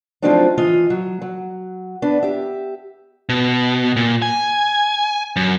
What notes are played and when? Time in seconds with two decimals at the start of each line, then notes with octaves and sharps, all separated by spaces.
0.22 F3 F#3 A3 C4 D4 D#4
0.57 E3 F4 D#5
0.90 F#3
1.22 F#3
2.02 B3 D4
2.23 G4 E5
3.29 B2
3.96 A#2
4.22 G#5
5.36 F#2